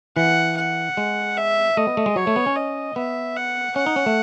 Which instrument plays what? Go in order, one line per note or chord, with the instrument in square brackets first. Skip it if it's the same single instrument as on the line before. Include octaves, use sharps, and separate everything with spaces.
[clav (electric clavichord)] E3 [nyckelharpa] F#5
[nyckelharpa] F#5
[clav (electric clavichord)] G#3
[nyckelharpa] E5
[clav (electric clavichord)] A3 [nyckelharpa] D#5
[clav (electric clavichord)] B3
A3
G#3
[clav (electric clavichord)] F#3 [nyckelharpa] C#5
[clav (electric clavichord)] A3
B3
C#4
[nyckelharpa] D#5
[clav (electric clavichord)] B3 [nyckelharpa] E5
[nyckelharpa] F#5
[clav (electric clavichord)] C#4 [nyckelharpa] F#5
[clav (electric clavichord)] D#4
C#4
A3